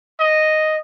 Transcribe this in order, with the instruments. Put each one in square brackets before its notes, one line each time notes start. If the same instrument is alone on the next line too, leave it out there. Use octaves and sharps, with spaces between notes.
[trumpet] D#5